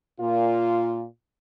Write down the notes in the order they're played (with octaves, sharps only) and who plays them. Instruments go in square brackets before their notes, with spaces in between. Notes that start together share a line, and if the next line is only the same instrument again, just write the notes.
[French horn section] A#2 F4